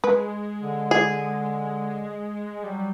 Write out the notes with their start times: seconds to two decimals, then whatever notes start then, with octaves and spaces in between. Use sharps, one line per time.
0.04 G#3 B4
0.62 D3
0.91 G#4
2.64 F#3 G3